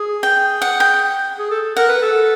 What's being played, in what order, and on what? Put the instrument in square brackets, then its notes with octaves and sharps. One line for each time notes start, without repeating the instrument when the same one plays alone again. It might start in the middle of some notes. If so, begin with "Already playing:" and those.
Already playing: [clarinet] G#4
[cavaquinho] G5
F#5
G5
[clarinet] G#4
A4
[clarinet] A#4 [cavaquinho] F#5
[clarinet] B4
A4